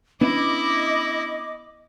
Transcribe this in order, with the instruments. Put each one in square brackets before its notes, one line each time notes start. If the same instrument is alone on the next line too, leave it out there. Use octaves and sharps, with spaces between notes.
[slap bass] B3 C#4 D4 [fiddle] E4 [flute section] D#5 D6